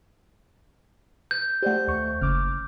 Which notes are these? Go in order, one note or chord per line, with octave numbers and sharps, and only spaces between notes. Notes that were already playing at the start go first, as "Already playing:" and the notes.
G6
A3 G4 C5 D5 F#5
D#2 C#6
F#1 C#3 D6 F6